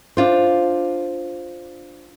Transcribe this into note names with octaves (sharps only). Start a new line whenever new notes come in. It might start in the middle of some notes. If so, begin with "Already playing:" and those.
D4 F4 C5